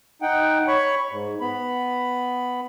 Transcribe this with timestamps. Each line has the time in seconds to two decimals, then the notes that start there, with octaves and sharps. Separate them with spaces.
0.22 D#4 F#5 G5
0.68 C#5 B5 C#6
1.11 G#2
1.41 B3 B5